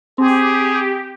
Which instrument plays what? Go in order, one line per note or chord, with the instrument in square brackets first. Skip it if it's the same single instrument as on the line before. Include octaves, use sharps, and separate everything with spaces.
[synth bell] C4 [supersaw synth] G4 [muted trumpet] G#4